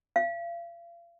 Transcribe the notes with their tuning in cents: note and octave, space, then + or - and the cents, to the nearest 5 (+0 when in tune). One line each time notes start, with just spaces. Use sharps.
F5 -40